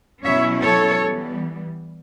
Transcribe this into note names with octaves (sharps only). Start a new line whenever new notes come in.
B2 F#3 C#4 E4 C#5 E5
A4 C#5
E3 G3 B3